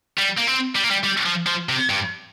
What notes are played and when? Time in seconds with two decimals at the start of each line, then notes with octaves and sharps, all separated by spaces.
0.18 G3
0.37 A#3
0.47 C4
0.75 G3
0.84 A#3
0.90 G3
1.04 G3
1.26 F3
1.47 F3
1.69 C3
1.90 G2